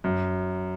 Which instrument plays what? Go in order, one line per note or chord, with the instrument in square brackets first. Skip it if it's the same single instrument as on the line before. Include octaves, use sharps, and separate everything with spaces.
[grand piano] F#2